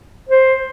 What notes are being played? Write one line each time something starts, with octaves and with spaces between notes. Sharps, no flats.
C5